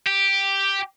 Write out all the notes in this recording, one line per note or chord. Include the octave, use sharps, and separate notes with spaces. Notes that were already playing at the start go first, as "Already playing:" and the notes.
G4